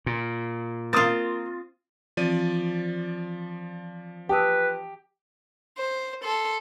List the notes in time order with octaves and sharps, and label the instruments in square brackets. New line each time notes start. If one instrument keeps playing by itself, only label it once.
[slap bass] A#2
[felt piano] A#3 [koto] C4 F4 [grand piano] D#6 A6
[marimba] E3 C4 [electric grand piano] F3 D5 D#7
[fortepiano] G4 [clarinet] B4 [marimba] A5 D#6 E6
[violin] C5
A4 C6